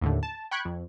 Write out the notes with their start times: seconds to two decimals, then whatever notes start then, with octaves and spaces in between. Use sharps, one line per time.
0.01 D#2 A2 D3
0.23 A5
0.51 G5 B5 C#6 F#6 G#6
0.65 F2